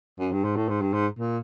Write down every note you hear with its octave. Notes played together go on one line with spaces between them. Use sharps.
F#2
G2
G#2
A2
G#2
G2
G#2
A#2